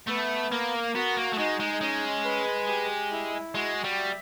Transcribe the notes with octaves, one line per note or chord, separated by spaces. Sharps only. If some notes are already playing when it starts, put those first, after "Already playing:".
A3 B3
A#3 A#4
B3 F#4
A#3
A3
G#3 D#4
G#3
G#3 C#4
B4
G4
E4
G#3 F#4
G3
E5